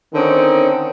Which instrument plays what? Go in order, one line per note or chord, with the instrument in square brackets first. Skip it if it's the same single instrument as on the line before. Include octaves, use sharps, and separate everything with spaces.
[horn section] D3 D#3 C4 C#4 D#4